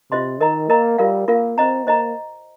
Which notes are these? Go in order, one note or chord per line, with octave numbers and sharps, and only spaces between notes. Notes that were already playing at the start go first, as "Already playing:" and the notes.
C3 F4 C5 D#5 C6
D#3 A#4 D#5 A#5
A#3 A#4 D#5 A#5
G3 F4 A#4 F5
A#3 F4 A#4 F5
C4 C5 D#5 A#5
A#3 C5 D#5 A#5